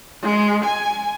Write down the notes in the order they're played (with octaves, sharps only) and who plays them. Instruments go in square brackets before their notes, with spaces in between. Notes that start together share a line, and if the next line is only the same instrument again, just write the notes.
[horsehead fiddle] G#3
G#5